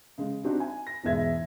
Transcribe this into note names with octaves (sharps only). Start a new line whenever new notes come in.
C#3 G#3
C4 D4 D#4 F#4 G4
G#5
A#6
E1 E2 G#2 G#3 E5 G#6